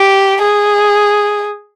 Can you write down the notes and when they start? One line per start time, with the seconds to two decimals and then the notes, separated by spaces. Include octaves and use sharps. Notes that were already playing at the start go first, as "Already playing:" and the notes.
Already playing: G4
0.42 G#4